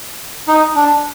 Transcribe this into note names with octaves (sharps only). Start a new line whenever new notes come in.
D#4
D4